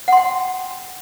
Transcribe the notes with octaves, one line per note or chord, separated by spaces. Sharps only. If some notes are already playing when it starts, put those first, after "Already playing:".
F#5 G5 C6